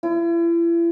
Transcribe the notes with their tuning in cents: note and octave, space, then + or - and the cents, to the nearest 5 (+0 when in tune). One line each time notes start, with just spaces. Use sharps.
E4 +40